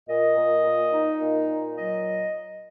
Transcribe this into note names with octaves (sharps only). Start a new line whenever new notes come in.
A#2 D#5
A#2
A#2
D#4
A#2
A#2
F#3 D#5